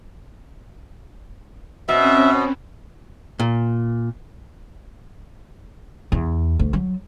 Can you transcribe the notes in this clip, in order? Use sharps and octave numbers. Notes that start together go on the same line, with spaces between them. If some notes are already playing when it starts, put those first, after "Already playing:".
B2 C4 C#4 E5
A#2
E2
D2
F#3